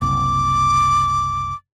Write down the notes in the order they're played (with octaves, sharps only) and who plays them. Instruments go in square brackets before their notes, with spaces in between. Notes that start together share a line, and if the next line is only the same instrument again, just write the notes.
[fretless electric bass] F#1 C2 [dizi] D6